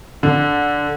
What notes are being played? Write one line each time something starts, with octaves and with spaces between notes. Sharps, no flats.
D3